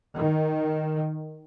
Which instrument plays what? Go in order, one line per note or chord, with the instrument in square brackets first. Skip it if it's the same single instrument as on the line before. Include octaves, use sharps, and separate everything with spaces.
[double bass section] D#3